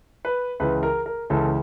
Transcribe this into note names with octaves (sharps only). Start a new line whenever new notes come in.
B4
C#2 C#3 E3 B4
A#4
A#4
C#2 C#3 E3 A4